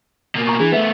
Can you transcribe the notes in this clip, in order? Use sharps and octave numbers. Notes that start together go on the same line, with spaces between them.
B2 A#3
A#5 C#6
E3 D4 G#4
A3 B3 B4 E5